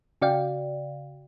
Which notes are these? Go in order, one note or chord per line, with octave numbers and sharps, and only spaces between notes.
C#3 F#4 D5 F5 G5